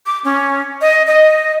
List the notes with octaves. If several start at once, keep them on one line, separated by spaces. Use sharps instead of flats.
D6
C#4
D#5
D#5